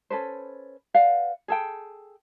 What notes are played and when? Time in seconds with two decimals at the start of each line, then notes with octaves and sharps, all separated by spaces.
0.10 C#4 A4 B4 C5
0.94 B4 D5 F5 F#5
1.48 G#4 A4 G5